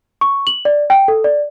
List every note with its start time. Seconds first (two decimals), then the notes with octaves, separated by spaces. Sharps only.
0.21 C#6
0.47 F#7
0.65 D5
0.90 G5
1.08 A4
1.24 D5